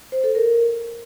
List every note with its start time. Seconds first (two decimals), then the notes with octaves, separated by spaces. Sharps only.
0.12 C5
0.24 A4
0.35 A#4